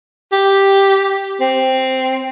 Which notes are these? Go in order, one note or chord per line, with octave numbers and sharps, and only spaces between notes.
G4
C4